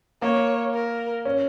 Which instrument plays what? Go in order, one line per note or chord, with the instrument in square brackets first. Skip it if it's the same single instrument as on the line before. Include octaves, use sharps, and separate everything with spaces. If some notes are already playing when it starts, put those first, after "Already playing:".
[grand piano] A#3 [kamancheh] C#5
[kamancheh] A#4
[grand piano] C#4